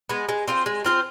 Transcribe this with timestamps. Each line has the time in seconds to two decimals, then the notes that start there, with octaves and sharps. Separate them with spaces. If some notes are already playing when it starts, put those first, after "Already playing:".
0.09 G#3 B3
0.29 G#3
0.48 C4 F4 C5
0.66 G#3
0.84 C4 F4 C5